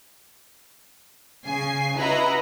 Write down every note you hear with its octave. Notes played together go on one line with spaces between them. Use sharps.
C#3 G#5 C7
E4 F#4 B4 D#5 A#5 B5